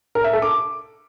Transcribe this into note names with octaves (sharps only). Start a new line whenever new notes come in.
A#4
E5
A4
D6